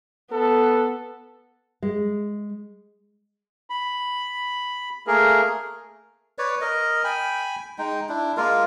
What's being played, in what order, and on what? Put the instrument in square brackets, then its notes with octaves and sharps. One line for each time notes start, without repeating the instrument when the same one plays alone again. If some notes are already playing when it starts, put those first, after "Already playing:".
[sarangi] B3 [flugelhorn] A4
[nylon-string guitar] G#3
[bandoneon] B5
A3 A#3 G#4 A#4
[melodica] B4 C#5 D5
A#4 D#5
G5 G#5 B5
G#3 D#4 G5
D4 E4
G#3 A#3 F4 A#4